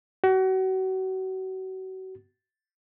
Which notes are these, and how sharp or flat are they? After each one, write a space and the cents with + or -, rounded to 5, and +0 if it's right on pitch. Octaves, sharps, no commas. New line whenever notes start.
F#4 +35